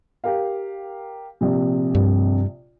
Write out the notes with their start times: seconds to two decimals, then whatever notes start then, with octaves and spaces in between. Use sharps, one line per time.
0.24 G4 A#4 F5
1.41 A#1 C3
1.95 G2